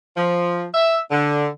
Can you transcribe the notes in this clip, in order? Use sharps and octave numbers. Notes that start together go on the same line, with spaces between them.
F3
E5
D3